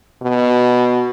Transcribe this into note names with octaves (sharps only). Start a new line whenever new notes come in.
B2